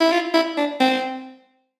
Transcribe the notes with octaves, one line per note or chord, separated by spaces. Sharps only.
E4
F4
E4
D4
C4